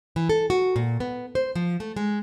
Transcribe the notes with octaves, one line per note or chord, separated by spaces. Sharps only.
E3
A4
F#4
A#2
B3
C5
F3
A3
G#3